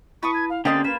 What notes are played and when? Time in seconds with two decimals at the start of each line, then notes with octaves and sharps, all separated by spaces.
0.23 E4 B4 A5 C#6 D#6
0.34 G#6
0.50 F5
0.65 D3 A#3 C4 C#4 G4 D#5 C6 A6
0.84 A#3 F4 B4 E7